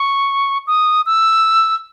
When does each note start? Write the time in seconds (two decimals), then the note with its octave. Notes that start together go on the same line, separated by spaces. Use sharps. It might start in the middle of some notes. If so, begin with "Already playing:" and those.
Already playing: C#6
0.67 D#6
1.06 E6